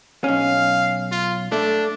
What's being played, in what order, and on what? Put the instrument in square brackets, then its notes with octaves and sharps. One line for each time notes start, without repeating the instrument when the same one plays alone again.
[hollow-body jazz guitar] B1 C#4 [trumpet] F5
[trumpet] F4
[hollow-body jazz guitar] A3 [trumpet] D4